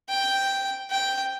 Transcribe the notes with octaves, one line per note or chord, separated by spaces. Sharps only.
G5
G5